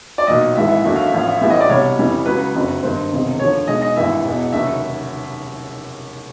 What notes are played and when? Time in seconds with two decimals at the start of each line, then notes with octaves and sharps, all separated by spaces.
0.18 D5
0.27 B1 A#2 F#3 D#5
0.56 G#1 G#2 E3 E5
0.70 E5
0.85 D#2 D3 F#3 E5
0.96 F5
1.06 E5
1.12 A1 A2 F3 F5
1.29 E5
1.41 A1 A2 E3 G3 E5
1.50 D#5
1.60 D5
1.69 C2 B2 G3 C#5
1.98 F2 C#3 E3 G3
2.25 C#2 C#3 F#3 B4
2.55 F#1 F2 D3 F#3
2.83 G#1 G2 D#3 C5
3.11 E1 E2 C3 D#3
3.40 D#2 D3 F3 C#5
3.67 B1 B2 G#3 D#5
3.82 D#5
3.96 G#1 G2 E3 E5
4.24 E1 E2 B2
4.52 F1 D#2 C#3 F#3 E5